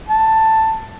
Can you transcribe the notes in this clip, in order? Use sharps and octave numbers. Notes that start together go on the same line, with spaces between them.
A5